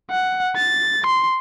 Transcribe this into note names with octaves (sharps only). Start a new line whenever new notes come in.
F#5
A6
C6